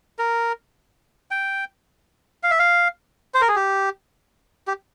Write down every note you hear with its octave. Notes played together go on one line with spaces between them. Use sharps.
A#4
G5
F5
E5
F5
C5
A#4
G#4
G4
G4